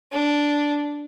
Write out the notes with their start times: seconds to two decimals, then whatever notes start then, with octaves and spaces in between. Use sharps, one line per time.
0.12 D4